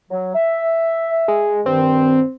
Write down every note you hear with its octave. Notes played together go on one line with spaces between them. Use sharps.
F#3
E5
G#3
G2 D#3 C4